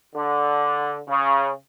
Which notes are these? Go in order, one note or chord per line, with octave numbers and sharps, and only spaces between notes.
D3
C#3